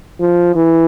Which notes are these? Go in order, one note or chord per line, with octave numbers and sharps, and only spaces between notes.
F3
E3